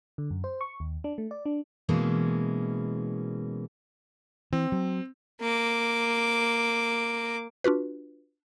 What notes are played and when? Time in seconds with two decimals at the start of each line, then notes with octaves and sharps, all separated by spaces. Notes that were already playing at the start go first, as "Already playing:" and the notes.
0.18 D3
0.30 F#2
0.44 C5
0.61 C#6
0.80 D#2
1.04 D4
1.18 A3
1.31 D5
1.45 D4
1.89 B2 E3 G#3 A#3 C#4
4.53 E3 C4
4.72 F#3
5.41 A#3 D6
7.64 D4 F4 F#4 B4